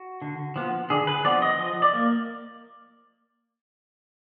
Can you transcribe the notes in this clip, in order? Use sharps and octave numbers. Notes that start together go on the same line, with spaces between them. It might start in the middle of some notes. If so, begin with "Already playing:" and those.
Already playing: F#4
D3
F3 B3
D3 G#4
B4
F3 B3 D5
D#5
F3 D#5
D5
A#3